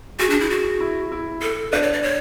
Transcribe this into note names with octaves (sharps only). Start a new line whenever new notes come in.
F#4 G#4
D4
E4
F#4
E4
E4
A4
D4 B4
C#5
D5
C#5